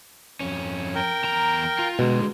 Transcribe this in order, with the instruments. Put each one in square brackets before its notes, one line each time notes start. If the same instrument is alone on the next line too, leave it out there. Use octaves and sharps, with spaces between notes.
[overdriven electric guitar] F2 C#4
[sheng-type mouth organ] A#4 G5
[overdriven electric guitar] E2 A#5
F4
[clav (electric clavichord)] B2 [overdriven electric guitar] D3 G#3